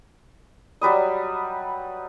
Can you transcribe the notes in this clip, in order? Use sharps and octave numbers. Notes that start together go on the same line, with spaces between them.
F#3 G3 B4 D#5